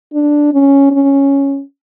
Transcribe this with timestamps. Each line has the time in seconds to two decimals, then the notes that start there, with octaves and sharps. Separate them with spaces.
0.13 D4
0.53 C#4
0.91 C#4